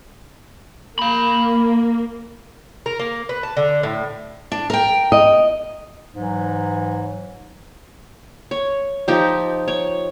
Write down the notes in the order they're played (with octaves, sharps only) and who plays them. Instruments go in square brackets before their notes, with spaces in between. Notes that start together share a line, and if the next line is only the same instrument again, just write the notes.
[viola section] A#3 [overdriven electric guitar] F5 B5
[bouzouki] A#4
A#3
B4
A5
D3
A2
[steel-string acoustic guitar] D4
A#4 G5
[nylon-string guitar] D#5
[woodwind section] G#2 E3 F#3
[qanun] C#5
F3 D#4 G4
C#5